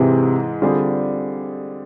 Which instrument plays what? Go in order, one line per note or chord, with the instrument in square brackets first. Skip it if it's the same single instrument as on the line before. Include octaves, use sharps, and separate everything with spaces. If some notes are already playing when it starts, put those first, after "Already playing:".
Already playing: [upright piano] G#2 E3 G#3 [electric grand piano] C3
[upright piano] D3 G3 C4 F4 G#4